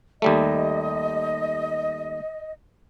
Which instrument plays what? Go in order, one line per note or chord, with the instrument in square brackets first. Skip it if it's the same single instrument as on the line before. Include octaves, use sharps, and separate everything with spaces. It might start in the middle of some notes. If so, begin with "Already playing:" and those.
[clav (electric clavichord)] D#2 G3 A3 [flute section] D#5